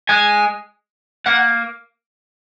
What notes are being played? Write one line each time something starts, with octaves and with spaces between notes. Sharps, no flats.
G#3 G#5
A#3 F#5